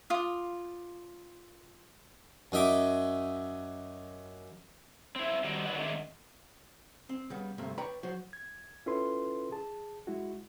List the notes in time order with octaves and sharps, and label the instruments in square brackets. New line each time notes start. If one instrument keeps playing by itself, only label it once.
[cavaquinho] F4 D6 D#6
[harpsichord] F#2 D#4 E5 D6
[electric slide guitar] C4 E4
D#3 G3 C4 D#4 F#4 D5
D#3 F#3 B4 D5 F#5
D3 D#3 G#3 A3 C4 D4
[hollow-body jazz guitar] C4
C#3 G3 B3
D2 G2 C3 A3 A#3
B4 C#5 D5 G5 A#5 B5
F#3 F#4 C5
[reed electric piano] G#6
C#4 E4 F4 A4 B4 C6
G#4 A5
G#3 E4 F#4